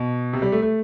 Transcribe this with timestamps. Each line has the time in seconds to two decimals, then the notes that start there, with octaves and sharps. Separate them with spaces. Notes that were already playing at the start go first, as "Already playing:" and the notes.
Already playing: B2
0.33 C3
0.42 G3
0.52 A3
0.62 A3